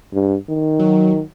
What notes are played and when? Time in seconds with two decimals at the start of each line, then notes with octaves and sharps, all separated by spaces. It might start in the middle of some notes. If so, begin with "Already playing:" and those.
0.13 G2
0.49 D#3
0.79 F#3